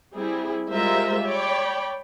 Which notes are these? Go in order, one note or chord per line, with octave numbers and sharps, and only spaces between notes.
G3 C4 E4 G#4
G3 G#3 F4 A#4 C5 E5
C#5 D5 G5 B5